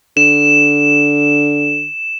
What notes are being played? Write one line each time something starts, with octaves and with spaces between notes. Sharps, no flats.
D3 E7